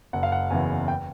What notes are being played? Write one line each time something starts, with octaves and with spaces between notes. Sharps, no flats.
F#1 F#5
F5
F#5
E2 C#3 E3 G#5
G5